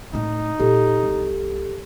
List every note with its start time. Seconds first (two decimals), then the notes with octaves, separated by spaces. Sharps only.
0.13 A2 C3 D#4
0.60 A#2 G4 A4
1.03 C2